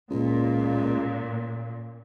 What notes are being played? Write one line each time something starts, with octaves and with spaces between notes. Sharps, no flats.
C#2 A#2